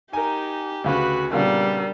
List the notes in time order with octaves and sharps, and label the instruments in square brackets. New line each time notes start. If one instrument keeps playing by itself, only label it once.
[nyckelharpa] D#4 [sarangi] G4 [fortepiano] A#4 G#5
[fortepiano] D2 C#3 [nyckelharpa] F#4 B4
[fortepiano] A#2 C#3 B3 [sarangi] G3 [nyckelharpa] D4 A#4